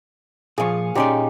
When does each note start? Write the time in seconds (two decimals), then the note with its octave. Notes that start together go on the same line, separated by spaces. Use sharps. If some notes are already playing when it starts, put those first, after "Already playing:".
0.58 A#2 F3 G#4 F5 C#6
0.95 A#2 G#3 C#4 D#4 G4 D5